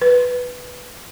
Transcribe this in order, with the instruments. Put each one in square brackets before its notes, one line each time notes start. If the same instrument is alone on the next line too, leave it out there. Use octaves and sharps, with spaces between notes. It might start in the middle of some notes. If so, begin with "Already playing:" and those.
[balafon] B4